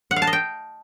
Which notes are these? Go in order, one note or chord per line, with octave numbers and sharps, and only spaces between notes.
F#5
F5
A5
D#5
G5